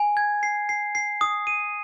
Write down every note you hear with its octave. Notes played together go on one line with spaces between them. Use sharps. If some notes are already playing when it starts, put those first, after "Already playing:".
Already playing: G#5
G#6
C7
C7
C7
D#6
D#7